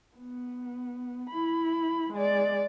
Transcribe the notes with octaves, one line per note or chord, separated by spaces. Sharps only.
B3
E4 B5
G#3 D5